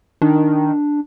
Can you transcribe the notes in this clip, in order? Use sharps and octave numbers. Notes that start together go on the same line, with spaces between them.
D#3 D4